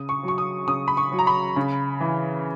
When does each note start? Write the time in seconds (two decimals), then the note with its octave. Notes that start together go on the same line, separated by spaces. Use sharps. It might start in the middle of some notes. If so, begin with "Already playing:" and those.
Already playing: C#3 D#6
0.09 C#6
0.23 F#3 C#6
0.38 D#6
0.67 C#3 D#6
0.88 B5
0.97 C#6
1.12 F#3
1.19 A#5
1.27 B5
1.56 C#3
2.00 E3